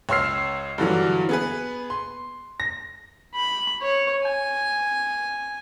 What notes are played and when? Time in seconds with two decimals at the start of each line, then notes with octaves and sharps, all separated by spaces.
0.09 C#2 C#5 C6 E6 F6 C7
0.78 G2 D3 E3 F#3
1.29 B3 G#4 B4
1.90 C6
2.60 A#6
3.35 B5
3.82 C#5
4.25 G#5